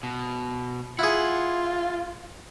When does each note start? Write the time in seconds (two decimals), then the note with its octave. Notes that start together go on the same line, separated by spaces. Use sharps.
0.03 B2
0.99 E4 F4 G#4 F#5